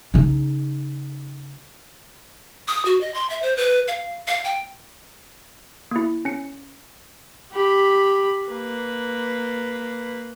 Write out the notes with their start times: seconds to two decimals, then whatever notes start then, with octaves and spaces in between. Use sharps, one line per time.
0.14 C#3 D#4
2.68 D#6
2.85 F#4
3.01 D#5
3.14 C6
3.30 E5
3.43 C5
3.57 B4
3.88 F5
4.28 F5
4.45 G5
5.91 A#3 E4
6.25 C#4 C#7
7.52 G4 B5
8.48 A#3 B4